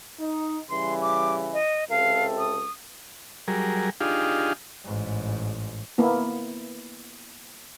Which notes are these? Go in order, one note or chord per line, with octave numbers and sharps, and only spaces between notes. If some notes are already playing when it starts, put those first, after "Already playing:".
D#4
C#3 E3 G3 C6
D6
D#5
C#2 C3 A4 F5
D#6
F#3 G3 G#4 A#4
D4 D#4 F4 G4 G#4 F5
A1 G#2
A#3 B3 E4